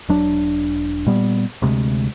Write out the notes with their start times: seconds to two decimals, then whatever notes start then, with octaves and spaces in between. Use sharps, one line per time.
0.09 E1 F#3 D4
1.06 A#2 G3 B3
1.62 D2 C3 G#3